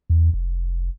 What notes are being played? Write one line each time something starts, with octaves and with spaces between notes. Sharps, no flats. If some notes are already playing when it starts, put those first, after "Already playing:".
E2
F1